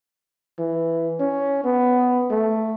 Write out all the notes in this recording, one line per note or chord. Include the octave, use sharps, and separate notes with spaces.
E3
C#4
B3
A3